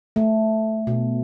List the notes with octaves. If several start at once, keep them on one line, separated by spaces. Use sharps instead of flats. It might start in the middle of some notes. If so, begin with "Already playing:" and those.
A3
B2